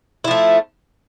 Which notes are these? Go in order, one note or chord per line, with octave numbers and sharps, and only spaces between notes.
F3 A3 E4